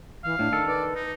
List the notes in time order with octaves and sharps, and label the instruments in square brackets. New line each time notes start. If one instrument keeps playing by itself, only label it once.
[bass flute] E3 [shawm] F5
[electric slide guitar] A2 [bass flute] D4
[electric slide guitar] D#3 A4
[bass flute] B4 [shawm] D5
[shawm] D#4